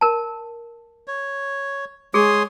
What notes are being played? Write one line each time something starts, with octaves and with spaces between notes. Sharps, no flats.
A#4 A5
C#5
G#3 G#4 C#5 C6 D#6